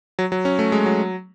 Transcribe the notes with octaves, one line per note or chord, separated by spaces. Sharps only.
F#3
F#3
C#4
A3
G#3
F#3